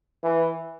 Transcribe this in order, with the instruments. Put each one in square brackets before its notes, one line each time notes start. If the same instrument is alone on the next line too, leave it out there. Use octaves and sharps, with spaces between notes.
[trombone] E3